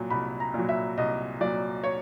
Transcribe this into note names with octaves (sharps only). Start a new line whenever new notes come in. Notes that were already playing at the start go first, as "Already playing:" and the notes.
Already playing: C2 A#2 F#3
C2 B5
A#5
A#2 F#3
E5
C2 D#5
A#2 F#3 D5
C#5